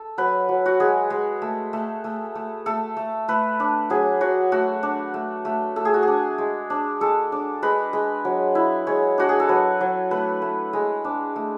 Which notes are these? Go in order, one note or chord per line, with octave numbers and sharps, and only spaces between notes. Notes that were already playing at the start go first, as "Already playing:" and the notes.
Already playing: A4
F#3 B4
F#3
F#4
G#3 G#4
G#3
A3
A3
A3
A3
A3 A4
A3
A3 B4
D4
F#3 G#4
F#3 F#4
A3 F#4
D4
A3
A3
A3 A4
G#4
F#4
D4 G#4
G#3
D4
G#3 A4
D4
G#3 B4
G#3
F#3
E4
G#3 C#5
D4 F#4
G#4
A4
F#3 B4
F#3
A3 B4
A3
G#3
D4
A3